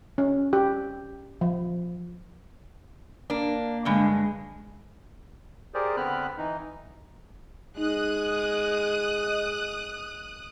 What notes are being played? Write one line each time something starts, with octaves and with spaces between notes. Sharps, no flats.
C#4
G4
F3
A#3 D4
G2 D3 G#3
G4 G#4 A#4 C5 D5
D3 B3 C4 B5 F6 F#6
E3 D#4
G#3 D#4 D#6 F#6
D#5